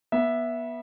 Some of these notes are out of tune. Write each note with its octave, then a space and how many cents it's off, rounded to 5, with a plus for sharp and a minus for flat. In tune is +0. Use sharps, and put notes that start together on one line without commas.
B3 -25 E5 +0